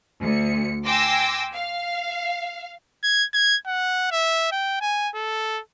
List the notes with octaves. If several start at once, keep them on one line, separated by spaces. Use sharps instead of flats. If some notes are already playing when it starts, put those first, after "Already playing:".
D2 C#7
G5 G#5 C6 D6 E6 A#6
F5
G#6
G#6
F#5
E5
G5
G#5
A4